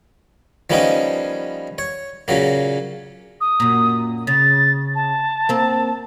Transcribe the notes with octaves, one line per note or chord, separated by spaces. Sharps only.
F3 G3 A#3 B3 C#4 D#4
C#5
A#2 C#3 F#3 A#3
D#6
F#2 A#2
C#3 A6
A5
A#3 C4